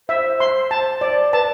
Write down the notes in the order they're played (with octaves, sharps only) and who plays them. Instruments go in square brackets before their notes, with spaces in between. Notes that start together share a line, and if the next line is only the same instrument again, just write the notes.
[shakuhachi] C5 [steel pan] E5
[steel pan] C6
A5
D5
[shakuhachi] B4 [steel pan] A5